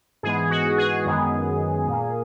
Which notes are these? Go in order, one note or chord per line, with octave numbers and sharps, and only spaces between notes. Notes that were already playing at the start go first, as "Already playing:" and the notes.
G#2 E3 G#3 B3 G#4
F#4
G#4
F#2 D#3 G#3 B3
A#2 A#3